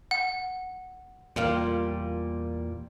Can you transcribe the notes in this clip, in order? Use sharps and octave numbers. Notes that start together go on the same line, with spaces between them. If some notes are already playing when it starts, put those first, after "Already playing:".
F#5
E2 A#2 G3 A#3 F4